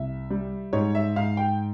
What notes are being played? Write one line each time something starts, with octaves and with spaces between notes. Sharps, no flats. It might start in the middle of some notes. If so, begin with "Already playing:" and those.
Already playing: C2 E5
G3
G#2 C#5
E5
G#2 F5
G5